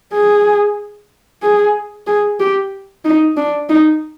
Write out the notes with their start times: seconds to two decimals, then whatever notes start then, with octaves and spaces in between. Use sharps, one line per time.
0.13 G#4
1.42 G#4
2.07 G#4
2.40 G4
3.05 D#4
3.37 D4
3.69 D#4